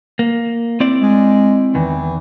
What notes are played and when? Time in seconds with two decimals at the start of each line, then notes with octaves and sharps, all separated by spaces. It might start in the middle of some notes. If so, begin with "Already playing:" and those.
0.19 A#3
0.80 C4 E4 D5
1.01 G#3
1.75 E2 D#3 E3